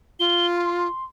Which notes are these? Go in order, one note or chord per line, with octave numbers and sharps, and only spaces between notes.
F4 G7
C6